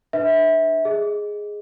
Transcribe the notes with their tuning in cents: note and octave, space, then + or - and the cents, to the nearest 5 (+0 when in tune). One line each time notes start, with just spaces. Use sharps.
D4 +20 B4 +0 E5 -25
G#4 +0 D#5 +0